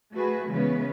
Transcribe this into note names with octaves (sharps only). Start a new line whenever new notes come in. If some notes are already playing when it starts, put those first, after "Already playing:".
A3 F#4 G#4 B4
C#3 E3 G#3 B3 C#4 B4